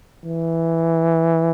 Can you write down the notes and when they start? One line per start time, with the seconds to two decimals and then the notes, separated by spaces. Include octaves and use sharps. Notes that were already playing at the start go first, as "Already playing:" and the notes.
0.24 E3